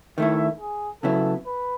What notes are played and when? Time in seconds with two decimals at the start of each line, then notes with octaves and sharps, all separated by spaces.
0.18 D#3 A3 E4 E5
0.60 G#4
1.03 C#3 F#3 B3 E4 A4
1.46 B4